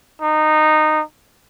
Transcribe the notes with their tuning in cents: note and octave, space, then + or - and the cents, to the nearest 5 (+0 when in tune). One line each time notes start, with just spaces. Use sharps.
D#4 -15